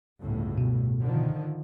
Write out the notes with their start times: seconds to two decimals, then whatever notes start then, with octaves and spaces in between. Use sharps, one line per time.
0.20 G1 C#2 A2
0.58 B2
1.02 D3 D#3 F3